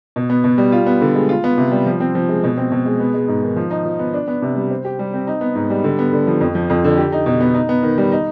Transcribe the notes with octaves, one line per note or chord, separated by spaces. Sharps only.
B2
B3
B2
G3
F4
B3
D3
G#3
F4
B3
C3
G3
F3
C4
F3
G#3
B2
C4
B2
G#3
B3
G#3
G#2
D#3
F3
D#4
F3
B3
D4
B3
C3
G3
C5
G4
G3
C4
D#4
B3
G#2
G3
D3
B3
D3
F3
F2
F3
F2
D3
G4
D#4
B2
B3
D#4
B3
D#3
G3
D#4